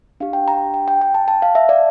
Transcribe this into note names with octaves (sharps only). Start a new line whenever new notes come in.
D4 G4 F5
G5
A#5
G5
G5
G5
A5
A5
F5
E5
D5